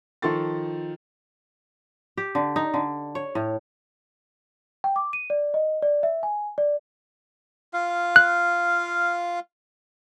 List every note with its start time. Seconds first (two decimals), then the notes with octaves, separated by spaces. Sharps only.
0.22 D#3 F3 A4 C6 C#6 A6
2.17 G4
2.35 D3
2.56 D#4
2.74 D3
3.15 C#5
3.35 A2
4.84 G5
4.96 D6
5.13 D#7
5.30 D5
5.54 D#5
5.83 D5
6.03 E5
6.23 G#5
6.58 D5
7.73 F4 F5
8.16 F#6